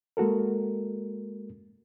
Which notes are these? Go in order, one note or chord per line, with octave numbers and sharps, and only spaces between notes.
G#3 A#3 F#4 A4 A#4